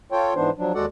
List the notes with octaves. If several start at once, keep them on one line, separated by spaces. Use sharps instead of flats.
F4 A4 C#5 G5
G#2 E3 B3 D4 C5
F3 F#3 D4
D#2 G#3 F#4 A4 D5 F#5